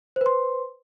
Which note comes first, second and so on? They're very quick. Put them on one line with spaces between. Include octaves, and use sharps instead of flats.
C5 B4 C6